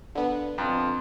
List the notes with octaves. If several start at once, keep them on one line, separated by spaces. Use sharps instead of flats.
D3 B3
F2